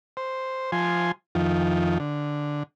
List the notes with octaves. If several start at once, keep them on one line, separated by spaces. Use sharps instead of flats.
C5
F3 G#5 C6
F2 D#3 F3
D3